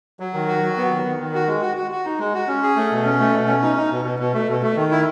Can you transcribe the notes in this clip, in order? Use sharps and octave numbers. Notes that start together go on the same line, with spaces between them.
F#3
D#3
F#4
F#3
B3
D#3
D#3
D#3
F#4
G#3
F#4
F#4
F#4
D#4
G#3
F#4
C#4
G#4
A3
B2
C#4
A3
B2
C#4
D#4
D#4
B2
B2
B2
A3
B2
A3
D#3
E4